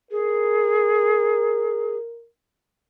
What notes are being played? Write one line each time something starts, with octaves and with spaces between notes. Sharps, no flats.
G#4 A#4